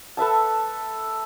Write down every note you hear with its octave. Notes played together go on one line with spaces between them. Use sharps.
A4 B4 E5 A5